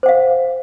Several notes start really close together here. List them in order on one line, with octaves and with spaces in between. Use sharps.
C5 F#5 F5